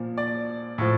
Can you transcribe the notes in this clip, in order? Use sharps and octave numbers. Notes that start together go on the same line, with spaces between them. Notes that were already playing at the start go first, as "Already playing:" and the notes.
Already playing: A#2 F3
D5
A2 F3